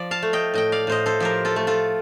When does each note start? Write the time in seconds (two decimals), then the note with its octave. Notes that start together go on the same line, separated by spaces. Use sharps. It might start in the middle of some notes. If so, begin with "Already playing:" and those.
Already playing: F3 D5
0.11 F5 A5
0.22 A3
0.33 D#5 G5
0.54 A2 D#5 G5
0.72 D5 F5
0.87 A2 C5 D#5
1.06 A4 C5
1.20 F3 G4 A#4
1.45 F4 A4
1.56 A3
1.67 F4 A4